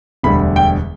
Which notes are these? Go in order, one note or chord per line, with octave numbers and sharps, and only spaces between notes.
E1 D2 D3 G3 B5
G5